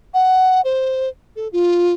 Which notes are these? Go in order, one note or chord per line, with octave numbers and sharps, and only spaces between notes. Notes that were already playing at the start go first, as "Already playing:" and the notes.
F#5
C5
A4
F4